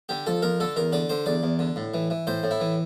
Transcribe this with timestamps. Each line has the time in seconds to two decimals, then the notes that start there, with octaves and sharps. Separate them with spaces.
0.09 D3 G4
0.26 F2 A4
0.42 F2 A#4
0.60 D3 A4
0.76 E2 A#4
0.92 D3 D5
1.09 D3 C5
1.26 E2 D5
1.43 E2
1.59 D3
1.76 A2
1.94 E3
2.10 E3
2.27 A2 C5
2.43 A2
2.51 E4
2.60 E3